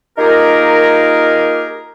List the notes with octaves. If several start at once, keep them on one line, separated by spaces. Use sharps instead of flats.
A#3 D#4 F4 G4 G#4 A#4